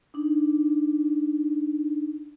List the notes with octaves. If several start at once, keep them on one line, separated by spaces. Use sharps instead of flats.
D4 D#4